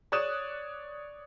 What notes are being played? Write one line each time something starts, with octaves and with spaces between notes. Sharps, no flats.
C#5 D5 D#6 F#6 E7